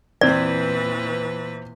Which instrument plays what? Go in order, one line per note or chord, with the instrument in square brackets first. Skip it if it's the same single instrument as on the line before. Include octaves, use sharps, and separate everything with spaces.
[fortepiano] E2 C4 [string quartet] A#2 E3 B4 [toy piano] D5